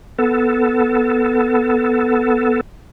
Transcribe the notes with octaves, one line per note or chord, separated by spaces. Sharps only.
B3 A4